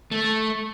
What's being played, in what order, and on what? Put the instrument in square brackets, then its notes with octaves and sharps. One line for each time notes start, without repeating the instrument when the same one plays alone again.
[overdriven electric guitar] A3